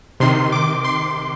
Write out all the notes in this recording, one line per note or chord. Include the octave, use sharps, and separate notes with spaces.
C3 D#3 C6
D6
C6